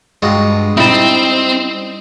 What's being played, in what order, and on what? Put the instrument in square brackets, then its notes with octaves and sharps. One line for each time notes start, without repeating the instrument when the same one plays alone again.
[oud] G2 [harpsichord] G#3 F4 F#4
[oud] G3 E4 [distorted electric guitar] C4 [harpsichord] D#4